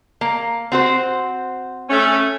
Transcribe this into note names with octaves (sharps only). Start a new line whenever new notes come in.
A#3
C4 F#4 C5
A3 C#4